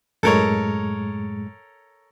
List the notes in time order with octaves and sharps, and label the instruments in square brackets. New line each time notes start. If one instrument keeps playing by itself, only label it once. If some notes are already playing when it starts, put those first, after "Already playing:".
[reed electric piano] F#2 A2 G#3 [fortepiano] A4 A#4 C#5